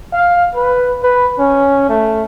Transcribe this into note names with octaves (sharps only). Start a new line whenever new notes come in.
F5
B4
B4
C#4
A3